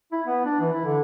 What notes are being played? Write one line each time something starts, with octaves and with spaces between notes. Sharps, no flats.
E4
B3
D4
E3
E4
D3